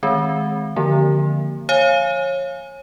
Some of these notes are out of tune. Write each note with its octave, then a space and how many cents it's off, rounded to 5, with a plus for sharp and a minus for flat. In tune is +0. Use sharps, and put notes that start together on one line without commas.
D#3 +20 G#3 +15 C4 +0
D3 +0 F3 +0 A#3 -10
C#5 -25 F5 -15 G#5 +0